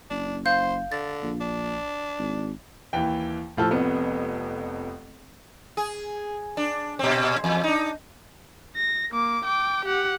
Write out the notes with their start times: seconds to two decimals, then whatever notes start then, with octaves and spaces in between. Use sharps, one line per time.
0.10 F#1 D4
0.46 C5 F5 G6
0.92 D3 A6
1.23 A#1
1.41 D4
2.19 G#1
2.93 D#2 E3 G5
3.57 A2 F3 A4 F6
3.71 F1 F2 B3
5.77 G#4
6.57 D4
6.99 A#2 C4
7.44 E2
7.64 D4 D#4
8.76 A#6
9.11 A#3 D6
9.44 G5 D6
9.85 G4 F#5